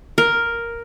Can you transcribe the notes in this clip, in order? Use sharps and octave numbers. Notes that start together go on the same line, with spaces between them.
A#4